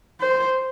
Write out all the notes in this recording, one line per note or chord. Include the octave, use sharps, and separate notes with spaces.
C5